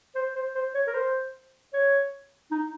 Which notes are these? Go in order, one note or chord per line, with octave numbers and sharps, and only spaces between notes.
C5
C5
C5
C#5
A#4
C5
C#5
D#4